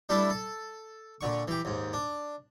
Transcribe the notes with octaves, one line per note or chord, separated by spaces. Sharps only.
G3 A3 D4 E4 A4
A4
A#2 D3 C#6
E3 G4
D#2 G#2
D4